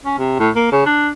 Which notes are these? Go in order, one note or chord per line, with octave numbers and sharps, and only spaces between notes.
C#4
C3
A2
A#3
C#3
D4